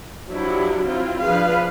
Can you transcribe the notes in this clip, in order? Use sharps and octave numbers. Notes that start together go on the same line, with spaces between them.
F3 F#3 D4 E4 G4
C4 E4 F4
F3 D4 G#4 B4 F5